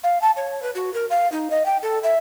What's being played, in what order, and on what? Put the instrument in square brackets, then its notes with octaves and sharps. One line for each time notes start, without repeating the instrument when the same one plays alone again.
[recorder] F5
A5
C#5
B4
F#4
A#4
F5
D#4
D#5
G5
A4
E5